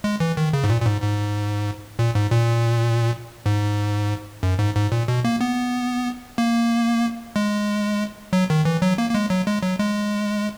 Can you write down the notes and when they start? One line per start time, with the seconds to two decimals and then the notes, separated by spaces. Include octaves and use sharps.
0.04 G#3
0.20 E3
0.37 D#3
0.53 C#3
0.64 G#2
0.70 A#2
0.81 A#2
0.86 G#2
1.02 G#2
1.99 A#2
2.15 G#2
2.32 A#2
3.46 G#2
4.43 F#2
4.59 G#2
4.75 G#2
4.92 A#2
5.08 B2
5.25 A#3
5.41 B3
6.38 A#3
7.36 G#3
8.33 F#3
8.50 D#3
8.65 E3
8.82 F#3
8.98 A#3
9.10 A#3
9.15 G#3
9.30 F#3
9.47 G#3
9.63 F#3
9.80 G#3